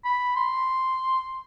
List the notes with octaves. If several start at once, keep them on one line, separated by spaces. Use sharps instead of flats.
B5
C6